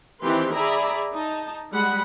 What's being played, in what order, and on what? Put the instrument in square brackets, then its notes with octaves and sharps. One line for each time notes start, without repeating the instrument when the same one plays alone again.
[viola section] D#3 E3 C4 G4 B4 C6
G#4 D5 E5 A#5 B5
D#4 A5
G3 G#3 F#5 B5